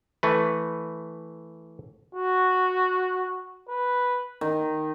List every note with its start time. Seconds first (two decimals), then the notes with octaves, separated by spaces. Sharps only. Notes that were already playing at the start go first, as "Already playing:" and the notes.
0.23 E3 A3 B4
2.15 F#4
3.69 B4
4.41 D#3